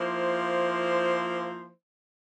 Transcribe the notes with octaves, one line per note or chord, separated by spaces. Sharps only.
F3 A#3 E4 C5